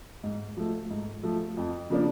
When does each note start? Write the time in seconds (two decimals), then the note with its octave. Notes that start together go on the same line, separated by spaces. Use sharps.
0.23 G#2
0.57 F3 A3
0.90 G#2
1.23 F3 A3
1.57 F2
1.90 C#3 F3 A#3 D4